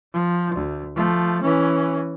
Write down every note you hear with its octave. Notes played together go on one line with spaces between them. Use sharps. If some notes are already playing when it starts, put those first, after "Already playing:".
F3
D2
F3 A3
E3 C#4